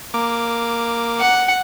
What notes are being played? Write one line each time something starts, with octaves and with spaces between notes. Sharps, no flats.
A#3 D6
F#5